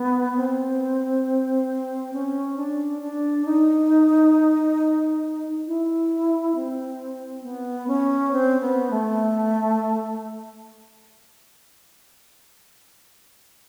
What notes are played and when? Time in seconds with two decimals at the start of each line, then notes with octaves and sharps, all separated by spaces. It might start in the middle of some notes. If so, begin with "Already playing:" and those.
Already playing: B3
0.36 C4
2.13 C#4
2.57 D4
3.02 D4
3.46 D#4
5.67 E4
6.55 C4
7.43 B3
7.88 C#4
8.32 C4
8.61 B3
8.91 A3